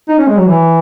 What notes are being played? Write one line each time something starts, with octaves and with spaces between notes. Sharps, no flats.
D#4
C#4
G#3
F#3
E3